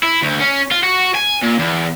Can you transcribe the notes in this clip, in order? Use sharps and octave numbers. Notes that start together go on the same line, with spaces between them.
E4
D2
C#4
F4
F#4
G#5
A#2
E2